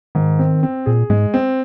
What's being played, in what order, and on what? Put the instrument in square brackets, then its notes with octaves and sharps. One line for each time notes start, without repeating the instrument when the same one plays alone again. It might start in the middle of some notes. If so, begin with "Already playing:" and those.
[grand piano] G#2 [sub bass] D#3
[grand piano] C4
C4
[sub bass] A#2 [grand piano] G#4
[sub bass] G#2 [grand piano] G#3
[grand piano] C4